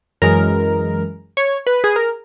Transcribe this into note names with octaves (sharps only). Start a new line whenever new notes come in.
F#2 E3 G#3 A#4
C#5
B4
G#4
A#4